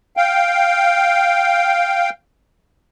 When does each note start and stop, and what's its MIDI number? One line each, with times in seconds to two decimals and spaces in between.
0.17 2.10 77
0.17 2.10 79